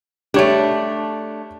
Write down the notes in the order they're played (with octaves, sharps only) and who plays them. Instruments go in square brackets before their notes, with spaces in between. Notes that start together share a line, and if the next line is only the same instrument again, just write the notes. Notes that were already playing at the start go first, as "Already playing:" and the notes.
[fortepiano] G3 C#5 [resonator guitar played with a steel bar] A3 D4